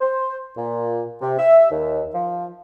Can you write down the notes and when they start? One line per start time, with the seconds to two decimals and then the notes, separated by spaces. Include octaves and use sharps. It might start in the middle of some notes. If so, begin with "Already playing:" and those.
0.01 C5
0.57 A#2
1.21 C3
1.39 E5
1.71 D#2
2.14 F3